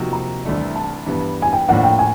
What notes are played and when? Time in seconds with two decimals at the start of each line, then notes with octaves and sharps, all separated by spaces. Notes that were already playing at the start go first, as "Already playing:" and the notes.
Already playing: C3 F3 A#3 D#4 F#4
0.13 A#5
0.45 C2 C3 E3 A3 D4
0.76 A5
1.06 G2 E3 G3 B3
1.42 G#5
1.53 G5
1.68 A2 F3 A#3 D4 F#5
1.84 G5
1.99 G#5